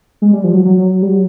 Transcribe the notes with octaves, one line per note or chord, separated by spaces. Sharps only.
G#3
G3
F3
F#3
F#3
G3
F#3